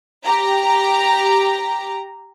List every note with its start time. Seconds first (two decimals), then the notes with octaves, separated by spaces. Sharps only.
0.23 G4 A#5